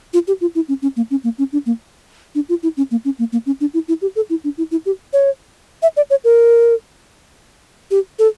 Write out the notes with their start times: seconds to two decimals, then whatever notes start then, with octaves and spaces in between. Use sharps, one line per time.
0.13 F4
0.28 G4
0.41 F4
0.55 E4
0.68 C#4
0.82 C#4
0.97 A#3
1.11 C#4
1.24 A#3
1.38 C#4
1.53 D4
1.66 A#3
2.35 D4
2.49 F4
2.63 E4
2.77 C#4
2.91 A#3
3.05 C#4
3.19 A#3
3.32 A#3
3.46 C#4
3.61 D4
3.74 E4
3.88 E4
4.02 G4
4.16 A4
4.30 E4
4.44 D4
4.58 E4
4.71 E4
4.86 G4
5.13 C#5
5.82 E5
5.97 D5
6.10 C#5
6.24 A#4
7.91 G4
8.19 A4